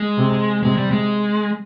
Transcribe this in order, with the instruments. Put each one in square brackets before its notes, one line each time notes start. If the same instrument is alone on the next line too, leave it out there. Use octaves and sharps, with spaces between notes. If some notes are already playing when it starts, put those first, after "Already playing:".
Already playing: [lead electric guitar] G#3
[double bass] C3
[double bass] C3 [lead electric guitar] G#3
[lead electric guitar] G3
G#3